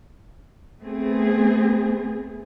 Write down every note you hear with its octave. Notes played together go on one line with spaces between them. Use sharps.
A3 B3 C4 G#4